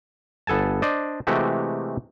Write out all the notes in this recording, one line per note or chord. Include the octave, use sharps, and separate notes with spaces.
G1 B3 A4 G#5 A5
D4 C5 D5 D#5
C3 E3 G#3 A3 F#4 G4